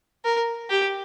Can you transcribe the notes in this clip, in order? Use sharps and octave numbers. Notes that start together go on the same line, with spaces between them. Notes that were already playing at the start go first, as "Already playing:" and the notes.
A#4
G4